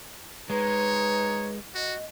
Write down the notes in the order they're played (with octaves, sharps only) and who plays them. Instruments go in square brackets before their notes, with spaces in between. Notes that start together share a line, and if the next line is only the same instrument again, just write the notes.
[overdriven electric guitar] G#3 [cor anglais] D#4 [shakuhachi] B4 [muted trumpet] C#5
[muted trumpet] F#4 [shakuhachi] D#5